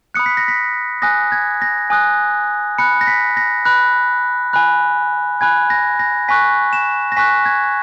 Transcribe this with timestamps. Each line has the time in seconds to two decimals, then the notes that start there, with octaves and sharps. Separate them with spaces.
0.14 B5 D#6 F#6 C#7
0.26 B6
0.37 A#6
0.48 B6
1.02 G#5 D#6 F#6 A#6
1.32 G#6
1.62 A#6
1.90 G#5 D#6 F#6
2.78 B5 F#6 C#7
3.01 A#6
3.07 B6
3.37 A#6
3.65 B5 F#6
4.53 G#5 B5 F#6
5.41 G#5 B5 F#6 G#6
5.70 A#6
5.99 A#6
6.28 G#5 C#6 F#6 B6
6.73 E7
7.12 A#6
7.17 G#5 C#6 F#6 B6
7.46 G#6